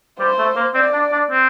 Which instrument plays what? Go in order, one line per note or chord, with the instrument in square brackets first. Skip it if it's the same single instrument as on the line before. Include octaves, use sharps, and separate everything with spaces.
[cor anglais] G3 [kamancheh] C5
[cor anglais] A3
A#3
[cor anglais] C4 [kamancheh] D5
[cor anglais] D4
D4
C4